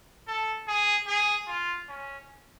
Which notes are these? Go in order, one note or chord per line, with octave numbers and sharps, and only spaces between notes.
A4
G#4
G#4
F4
C#4